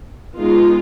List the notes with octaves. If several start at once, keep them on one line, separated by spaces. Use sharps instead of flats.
G#3 B3 D#4 F4